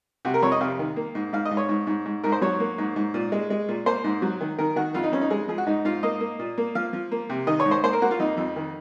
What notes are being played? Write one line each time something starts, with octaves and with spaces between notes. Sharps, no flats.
C3 F#4
A#4
F2 C#5
D#5
C3 F5
D#3
A#3
G#2
G#2 F5
D#5
G#2
C#5
G#2
G#2
G#2
G#2 A#4
C5
F#3 C#5
A#3
G#2
G#2
A#2
G#3
G#3
A#2
A#3 C5
G#2
F#3
D#3
D#3 A#4
D#3 F#4
F2 F4
D#4
F2 C#4
D#4
G#3 G#4
F3 G#4
F#4
G#2 D#4
G#2 F4
A#3 D#5
A#3
A#2
A#3
F3 F5
F3
A#3
C3
D#3 D#5
C#5
G#2
C5
A#3 C5
A#4
A#3 F#4
F4
F2 D#4
F2
D#3